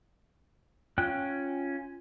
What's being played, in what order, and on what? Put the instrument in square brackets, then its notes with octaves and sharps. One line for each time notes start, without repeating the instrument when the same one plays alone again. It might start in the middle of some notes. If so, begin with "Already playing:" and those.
[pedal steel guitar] C#4 G5 F#6 [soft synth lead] F4